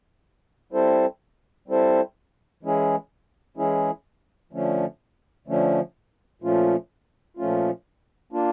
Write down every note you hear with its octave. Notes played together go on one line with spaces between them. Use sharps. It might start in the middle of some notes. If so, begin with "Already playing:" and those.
G3 C4 E4 A4 C5
G3 C4 E4 A4 C5
E3 G#3 C#4 E4 G#4
E3 G#3 C#4 E4 G#4
D3 F3 A3 C#4
D3 F3 A3 C#4
A#2 F3 A3 C#4 F4
A#2 F3 A3 C#4 F4
A#3 D4 F4